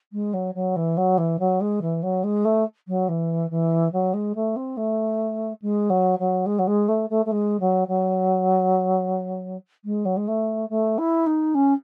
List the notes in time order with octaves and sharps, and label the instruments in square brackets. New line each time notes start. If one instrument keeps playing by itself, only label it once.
[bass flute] G#3
F#3
F#3
E3
F#3
E3
F#3
G#3
E3
F#3
G#3
A3
F#3
E3
E3
F#3
G#3
A3
C4
A3
G#3
F#3
F#3
G#3
F#3
G#3
A3
A3
A3
G#3
F#3
F#3
G#3
F#3
G#3
A3
A3
E4
D#4
C#4